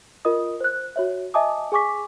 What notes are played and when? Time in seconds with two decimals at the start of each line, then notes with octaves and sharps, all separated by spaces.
0.25 F4 A#4 D#5 D#6
0.60 C5 F#6
0.96 F#4 C#5 E5
1.34 D#5 E5 G#5 A5 D6 D#6
1.72 G#4 G#5 C#6 D6 B6